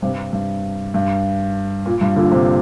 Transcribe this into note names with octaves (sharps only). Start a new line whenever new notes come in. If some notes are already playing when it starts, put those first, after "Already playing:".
G2 C3
G2
G2
A#2
G2
A#2 D3
G2 C3